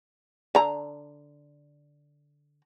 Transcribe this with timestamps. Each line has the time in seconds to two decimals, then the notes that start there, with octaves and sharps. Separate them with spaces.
0.55 D3 A#5